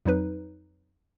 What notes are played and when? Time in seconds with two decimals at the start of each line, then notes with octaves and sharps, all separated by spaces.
0.05 F2 F#3 D#4 B4